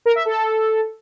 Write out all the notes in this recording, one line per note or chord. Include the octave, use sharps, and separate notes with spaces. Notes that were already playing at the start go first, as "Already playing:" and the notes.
A#4
E5
A4